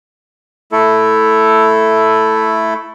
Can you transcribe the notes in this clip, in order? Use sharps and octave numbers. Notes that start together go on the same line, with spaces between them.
A3 E4 A4